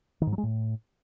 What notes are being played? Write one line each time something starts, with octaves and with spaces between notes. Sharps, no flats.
D#3
G#2
F#3
G#3
A2